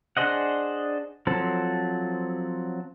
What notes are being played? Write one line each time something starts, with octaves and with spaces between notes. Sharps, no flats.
D4 G#4 C5 D#5 F#5
F3 F#3 C4 A4